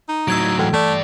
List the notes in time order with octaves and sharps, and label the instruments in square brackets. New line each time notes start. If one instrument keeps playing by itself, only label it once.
[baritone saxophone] D#4
[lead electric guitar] A2 F#3 [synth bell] E6 G#6 D7
[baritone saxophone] G#2 [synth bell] E3
[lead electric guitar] G2 D5 [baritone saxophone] A3